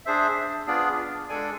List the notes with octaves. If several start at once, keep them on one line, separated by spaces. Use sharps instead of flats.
D4 G#4 C5 E5
B3 D4 F4 G#4 D5
G#3 D4 A4 D5 G#5